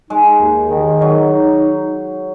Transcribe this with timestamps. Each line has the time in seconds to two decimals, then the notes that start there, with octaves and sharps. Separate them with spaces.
0.10 G#3 D#4
0.41 D#2
0.71 D#3
1.01 F#3 D#4
1.32 D#4